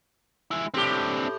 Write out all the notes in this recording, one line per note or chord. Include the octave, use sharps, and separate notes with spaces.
G#3 E4
A2 C4 D4 G4